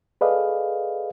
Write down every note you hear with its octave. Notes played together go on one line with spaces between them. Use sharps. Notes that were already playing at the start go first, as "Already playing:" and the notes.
G#4 A4 B4 D5 D#5 F5